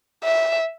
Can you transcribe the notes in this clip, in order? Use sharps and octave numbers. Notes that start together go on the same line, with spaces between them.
E5